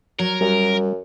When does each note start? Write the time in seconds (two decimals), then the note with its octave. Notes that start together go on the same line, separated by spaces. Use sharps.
0.19 F#3 A#4
0.41 F#2 G3